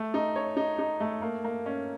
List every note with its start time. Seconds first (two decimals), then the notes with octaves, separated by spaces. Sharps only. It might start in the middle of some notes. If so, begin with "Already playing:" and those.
Already playing: A3
0.14 D#4
0.36 C#5
0.57 D#4
0.79 D#4
1.00 A3
1.22 A#3
1.44 A#3
1.66 C#4